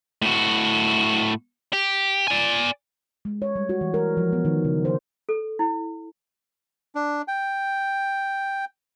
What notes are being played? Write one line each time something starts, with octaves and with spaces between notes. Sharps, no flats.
A2 F#4
G4
D5 G#5
G#3
C#5
G3
F#4
E3
A#4
F3
B3
D#3
C#3
C5
A4
E4
D4
G5